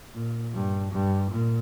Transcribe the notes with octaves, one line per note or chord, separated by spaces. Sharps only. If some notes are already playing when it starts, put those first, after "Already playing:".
A#2
G2
G2
A#2